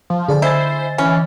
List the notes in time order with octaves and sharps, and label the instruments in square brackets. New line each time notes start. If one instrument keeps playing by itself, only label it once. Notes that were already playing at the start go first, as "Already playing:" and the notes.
[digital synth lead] F3
[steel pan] D3 [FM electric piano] G#4 D5 A5
[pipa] E4 [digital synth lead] C5 [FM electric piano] D#5 G#5 A6
[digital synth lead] E3 [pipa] C#4